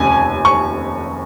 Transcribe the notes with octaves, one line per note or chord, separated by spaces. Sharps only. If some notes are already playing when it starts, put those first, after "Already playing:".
Already playing: F1 D#2 C#3 G#5
C#6